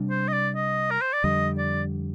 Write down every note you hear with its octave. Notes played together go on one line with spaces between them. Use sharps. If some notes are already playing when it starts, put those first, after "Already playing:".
Already playing: C3 G3 D4
C5
D#5
D5
D#5
A#4
C5
D5
F2 D3 G3 D#5
D5